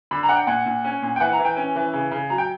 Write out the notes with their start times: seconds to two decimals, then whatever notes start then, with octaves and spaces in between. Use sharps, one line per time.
0.11 D3 B5
0.23 A#5
0.29 D4 F#5
0.35 G5
0.47 A#2 F#5
0.66 A#2
0.84 C#4
1.02 A#2
1.16 G5
1.20 E3 F#5
1.33 A#5
1.39 E3
1.45 G5
1.56 C#4
1.76 E3
1.93 C#3
2.11 C#3
2.30 F#3 A#5
2.38 G5